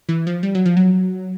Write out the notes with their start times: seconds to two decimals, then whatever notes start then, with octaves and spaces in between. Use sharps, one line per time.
0.09 E3
0.27 F3
0.43 G3
0.55 F#3
0.66 F3
0.77 F#3